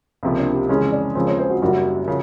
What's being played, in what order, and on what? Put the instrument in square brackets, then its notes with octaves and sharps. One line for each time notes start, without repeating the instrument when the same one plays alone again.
[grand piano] C#2 C3 F3 A#3 [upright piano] C#4
[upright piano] C#4
D4
G4
[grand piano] F2 C#3 E3 G#3 C#4 [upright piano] G#4
[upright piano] D5
[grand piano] D#2 C#3 F3 G#3 C4
[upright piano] C#5
C5
F#4
[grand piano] F#1 F#2 D#3 G3 [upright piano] F#4
[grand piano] C#3 F3